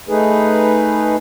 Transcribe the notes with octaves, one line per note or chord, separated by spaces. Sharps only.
A3 D#4 G#4 B4